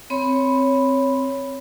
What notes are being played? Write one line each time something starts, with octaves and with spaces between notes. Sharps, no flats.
C4 C#5 B5 C6